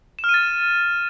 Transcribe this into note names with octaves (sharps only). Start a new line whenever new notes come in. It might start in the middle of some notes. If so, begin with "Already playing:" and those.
E7
F6
D#7
A6